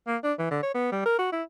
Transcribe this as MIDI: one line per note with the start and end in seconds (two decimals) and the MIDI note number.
0.07 0.17 58
0.24 0.33 62
0.39 0.49 52
0.51 0.61 50
0.63 0.72 73
0.74 0.92 59
0.92 1.02 55
1.06 1.18 70
1.19 1.32 66
1.32 1.43 64